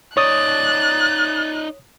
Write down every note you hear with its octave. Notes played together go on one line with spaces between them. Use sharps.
D#4 C#5 D5 D#6 F#6 A6